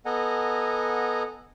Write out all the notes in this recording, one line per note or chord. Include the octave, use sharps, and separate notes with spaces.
B3 A4 D#5 F#5 G#5 A#5